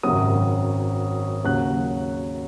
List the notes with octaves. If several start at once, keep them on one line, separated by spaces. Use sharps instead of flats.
G#1 F#2 C#3 F#3 D#6
D#2 C#3 F#3 F#6